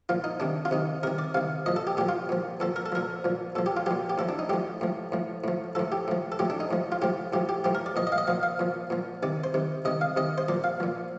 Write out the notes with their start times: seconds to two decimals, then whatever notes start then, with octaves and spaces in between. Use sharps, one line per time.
0.09 A#2 F3 F4
0.24 D#4
0.40 C3 D#3 D4
0.65 F4
0.71 C3 D#3 D#4
1.03 C3 D#3 A#4
1.19 D5
1.34 C3 D#3 F5
1.66 A#2 F3 D#5
1.76 A4
1.87 G4
1.97 A#2 F3 G4
2.09 F4
2.29 A#2 F3
2.60 A#2 F3 A4
2.76 A#4
2.86 A4
2.92 A#2 F3 A#4
3.24 A#2 F3
3.55 A#2 F3 A4
3.66 G4
3.77 F4
3.86 A#2 F3 G4
4.10 G4
4.18 A2 F3 A4
4.29 D4
4.39 D#4
4.49 A2 F3 G4
4.81 A2 F3
5.12 A2 F3
5.44 A2 F3
5.75 A2 F3 A4
5.92 G4
6.08 A2 F3
6.32 A4
6.39 A2 F3 G4
6.50 D4
6.60 D#4
6.71 A2 F3
6.92 F4
7.02 A2 F3 G4
7.33 A2 F3 G4
7.49 G4
7.64 A2 F3 G4
7.75 A#4
7.86 D5
7.96 A#2 F3 D#5
8.07 D#5
8.12 F5
8.18 D#5
8.27 A#2 F3 F5
8.43 F5
8.59 A#2 F3
8.90 A#2 F3
9.23 C3 D#3 D5
9.44 C5
9.54 C3 D#3
9.85 C3 D#3 D#5
10.01 F5
10.17 C3 D#3 D#5
10.38 C5
10.48 A#2 F3 D5
10.64 F5
10.80 A#2 F3